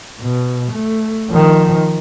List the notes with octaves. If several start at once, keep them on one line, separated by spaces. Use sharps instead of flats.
B2
A3
D#3 F3